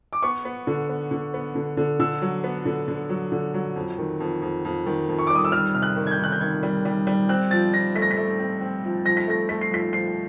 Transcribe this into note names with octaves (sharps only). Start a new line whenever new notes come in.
D6
B3 C#6
B3
D3
B3
D3
B3
D3
D3
D3 E6
F#3
B3
D3
D3
F#3
D3
F#3
F2
D#3
F2
F2
F2
D#3
F2
C#6
G3 D6
D#6
E6
G3 F6
C3 F6
F#6
D#3
G#6
G6
D#3 F#6
G6
D#3 G#6
G3
G3
G3
C4 F#6
F3 A6
F3 A#6
A3 B6
A#6
B6
A3
C4
C4
F3
F3 A#6
B6
A3 A#6
A3 B6
C7
F3 B6
F3 C7